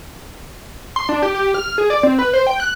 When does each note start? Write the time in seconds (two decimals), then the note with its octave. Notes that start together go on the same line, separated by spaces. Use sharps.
0.96 C6
1.09 D4
1.22 G4
1.35 G4
1.54 F6
1.78 G#4
1.90 D5
2.03 C4
2.19 B4
2.33 C5
2.47 G5
2.60 F#6